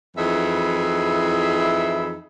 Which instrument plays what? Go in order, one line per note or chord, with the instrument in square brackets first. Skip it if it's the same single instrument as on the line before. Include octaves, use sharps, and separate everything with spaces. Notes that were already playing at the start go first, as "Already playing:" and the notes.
[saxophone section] F2 E3 D#4 E4 G#4 E5